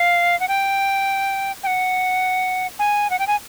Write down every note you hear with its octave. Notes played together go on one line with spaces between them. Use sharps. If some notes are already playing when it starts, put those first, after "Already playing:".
Already playing: F5
F#5
G5
G5
F#5
G#5
F#5
G5
G#5